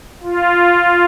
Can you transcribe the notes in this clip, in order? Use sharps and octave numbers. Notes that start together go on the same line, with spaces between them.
F4